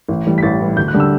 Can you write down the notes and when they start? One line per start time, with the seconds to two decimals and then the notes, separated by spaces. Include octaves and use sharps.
0.09 A1
0.26 A2 E3 G3
0.38 B6
0.43 A1 A6
0.60 A2 E3 G3
0.77 D2 G6
0.88 F#6
0.94 D3 G3
1.00 E6